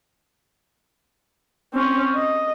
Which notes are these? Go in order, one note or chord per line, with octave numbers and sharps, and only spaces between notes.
C4 C#4
D#5